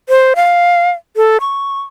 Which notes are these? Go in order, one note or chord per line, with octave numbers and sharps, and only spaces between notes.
C5
F5
A4
C#6